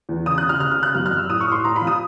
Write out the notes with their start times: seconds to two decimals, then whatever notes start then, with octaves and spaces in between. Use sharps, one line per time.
0.09 E2
0.26 C#3 D#6
0.38 C#3 F#6
0.49 F6
0.60 C#3 F6
0.71 F6
0.77 C#3
0.83 F#6
0.95 F#2 F6
1.06 F6
1.11 F#2
1.18 E6
1.29 A2 D#6
1.41 C#6
1.47 A2 C6
1.64 A2 A#5
1.76 B5
1.82 F3
1.87 D#6